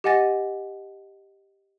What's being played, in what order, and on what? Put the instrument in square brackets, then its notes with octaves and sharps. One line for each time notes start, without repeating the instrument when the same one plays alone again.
[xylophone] G4 D#5 F#5 G#5 A6 A#6